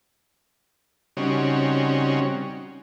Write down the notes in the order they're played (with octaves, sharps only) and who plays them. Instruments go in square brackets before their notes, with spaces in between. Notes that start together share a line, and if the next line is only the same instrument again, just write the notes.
[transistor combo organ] C#3 G3 C4 C#4 D#4 F#4